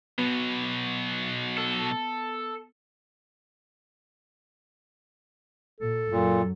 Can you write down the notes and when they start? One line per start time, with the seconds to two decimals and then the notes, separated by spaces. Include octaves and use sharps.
0.18 B2 F#3 B3
1.58 A4
5.80 A#2 A4
6.12 F#2 A#2 F#3